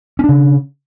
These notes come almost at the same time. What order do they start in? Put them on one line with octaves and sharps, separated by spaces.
C#4 D4 C#3